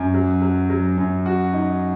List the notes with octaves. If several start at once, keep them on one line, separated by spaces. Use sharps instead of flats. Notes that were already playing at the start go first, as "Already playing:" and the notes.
Already playing: F#2
F#3
F#3
F#3
F#2
F#4
D#4